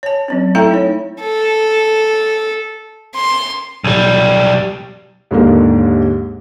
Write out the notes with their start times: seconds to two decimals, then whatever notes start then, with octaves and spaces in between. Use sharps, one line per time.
0.03 C#5 A5
0.28 F#3 C4 C#4
0.55 A3 E4 A4 E5 G5 A#5
0.71 D#4 C#5
1.22 A4
3.15 C6
3.84 B1 G3
5.31 D#2 G#2 D3 A#3 D#4 A#4